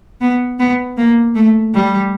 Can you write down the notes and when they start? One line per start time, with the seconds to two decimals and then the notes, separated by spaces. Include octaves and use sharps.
0.21 B3
0.59 B3
0.97 A#3
1.35 A3
1.74 G3